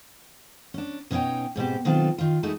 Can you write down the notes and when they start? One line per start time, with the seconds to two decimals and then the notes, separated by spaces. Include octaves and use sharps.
0.74 C#4 D4
1.11 B2 C#4 D#4 C#5 G5
1.56 G#2 B2 C4 G4
1.85 B2 D#3 F#3 C4 F4 A4
2.18 D#3 F4
2.43 G#3 A3 D#4 E4 F#4 A4